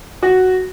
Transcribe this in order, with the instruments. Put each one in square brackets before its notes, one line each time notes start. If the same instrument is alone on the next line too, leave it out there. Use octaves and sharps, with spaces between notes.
[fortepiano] F#4